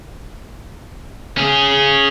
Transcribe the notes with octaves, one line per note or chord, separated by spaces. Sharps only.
C#4 G#4